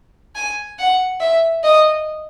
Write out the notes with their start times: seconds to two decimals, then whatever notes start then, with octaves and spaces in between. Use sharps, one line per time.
0.35 G#5
0.79 F#5
1.20 E5
1.63 D#5